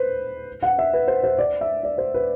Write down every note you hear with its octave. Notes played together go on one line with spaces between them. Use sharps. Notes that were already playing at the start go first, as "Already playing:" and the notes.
Already playing: B4 C5
F#5
E5
B4
C5
C5
D5
E5
D5
C5
B4